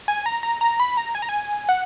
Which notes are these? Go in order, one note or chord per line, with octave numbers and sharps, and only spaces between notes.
G#5
A#5
A#5
A#5
B5
A#5
G#5
A#5
G#5
F#5